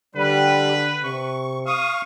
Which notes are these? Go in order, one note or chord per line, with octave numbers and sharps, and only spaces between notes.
D3 G3 B4
C3 C#6
F5 C#6 D#6